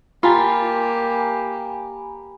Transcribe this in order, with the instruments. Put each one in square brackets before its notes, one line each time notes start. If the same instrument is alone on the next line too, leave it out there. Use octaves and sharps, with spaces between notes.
[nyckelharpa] A#3 G4 [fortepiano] F4 [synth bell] G#5 A#5 B5